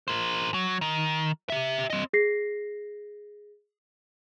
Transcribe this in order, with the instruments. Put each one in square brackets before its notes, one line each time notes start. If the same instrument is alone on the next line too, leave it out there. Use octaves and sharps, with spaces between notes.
[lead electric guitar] A#4 C5
F#3
D#3
G4 E5
C4 D#5
[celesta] G#4 A#6 C7